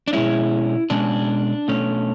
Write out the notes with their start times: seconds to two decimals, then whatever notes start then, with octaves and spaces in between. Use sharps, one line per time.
0.08 D4
0.13 B2 G#3 C#4 E4
0.90 B2 G#3 C#4 D4
1.68 B2 A3 C#4